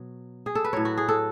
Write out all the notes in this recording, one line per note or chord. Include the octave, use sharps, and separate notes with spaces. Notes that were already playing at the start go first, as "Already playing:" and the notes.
Already playing: B2 F#3
G#4
A4
B4
A2 F#3 C#5
F#4
G#4
A4